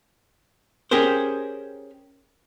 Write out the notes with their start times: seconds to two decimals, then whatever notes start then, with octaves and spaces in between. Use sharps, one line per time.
0.91 C#4 G4 G#4 A#4 C5